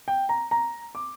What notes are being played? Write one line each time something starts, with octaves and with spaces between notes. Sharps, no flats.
G5
A#5
A#5
D6